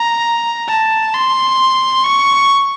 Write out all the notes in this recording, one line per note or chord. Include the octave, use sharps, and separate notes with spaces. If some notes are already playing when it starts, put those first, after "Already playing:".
Already playing: A#5
A5
C6
C#6